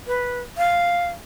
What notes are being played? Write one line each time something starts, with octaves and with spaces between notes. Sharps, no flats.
B4
F5